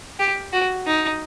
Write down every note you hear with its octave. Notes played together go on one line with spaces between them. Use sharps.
G4
F#4
D#4